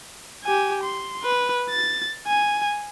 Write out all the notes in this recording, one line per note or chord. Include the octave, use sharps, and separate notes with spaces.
G4 G#5
C6
B4
A6
G#5